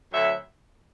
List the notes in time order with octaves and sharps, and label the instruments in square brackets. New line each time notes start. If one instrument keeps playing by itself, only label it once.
[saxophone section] D2 D3 F#3 E5